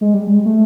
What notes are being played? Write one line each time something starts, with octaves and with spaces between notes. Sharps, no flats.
G#3
G3
G#3
A3